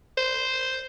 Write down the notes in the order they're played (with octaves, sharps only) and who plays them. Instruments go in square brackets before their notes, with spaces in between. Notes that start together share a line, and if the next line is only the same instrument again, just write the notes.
[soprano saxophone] C5